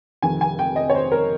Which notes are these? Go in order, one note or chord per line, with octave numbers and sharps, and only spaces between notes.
F1 F2 D#3 G#5
G#5
G5
D#5
C#5
C5
A#4